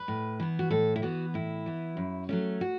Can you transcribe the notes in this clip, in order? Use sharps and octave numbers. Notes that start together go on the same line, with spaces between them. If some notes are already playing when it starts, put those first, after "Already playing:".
Already playing: B4
A2
E3 B3
F#4
A2 A4
E4
E3 B3 F#4
A2 E4
E3 B3
F#2
F#3 A3 C#4
F#4